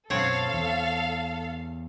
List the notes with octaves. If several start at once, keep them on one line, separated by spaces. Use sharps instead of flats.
B1 F#2 C4 A4 C#5 F5 F#5
E2